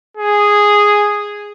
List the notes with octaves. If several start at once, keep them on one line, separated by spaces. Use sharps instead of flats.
G#4